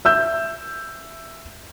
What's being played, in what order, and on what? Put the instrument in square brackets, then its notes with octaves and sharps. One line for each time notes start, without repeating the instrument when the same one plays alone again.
[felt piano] E5 E6 G6